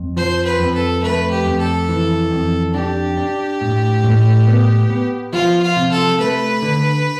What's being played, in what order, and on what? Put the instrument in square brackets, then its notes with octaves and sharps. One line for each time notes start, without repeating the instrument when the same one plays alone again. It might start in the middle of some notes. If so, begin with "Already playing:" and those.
Already playing: [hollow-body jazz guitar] F2
[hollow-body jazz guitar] F3 [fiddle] C5
[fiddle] B4
[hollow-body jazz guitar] F2
[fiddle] A4
[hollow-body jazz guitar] A3 [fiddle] B4
[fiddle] G4
[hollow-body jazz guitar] F2
[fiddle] A4
[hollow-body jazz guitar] E3
F2
[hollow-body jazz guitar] D4 [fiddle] G4
[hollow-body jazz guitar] D4
A2
A2
B3
B3
[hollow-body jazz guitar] F3 [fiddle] F4
[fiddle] F4
[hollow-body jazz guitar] C3
[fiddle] A4
[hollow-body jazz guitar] A3 [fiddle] B4
[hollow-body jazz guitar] D3